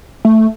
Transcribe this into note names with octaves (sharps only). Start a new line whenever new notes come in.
A3